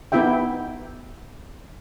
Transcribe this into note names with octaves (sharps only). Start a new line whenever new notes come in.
B3 D#4 E4 G4 E5 G5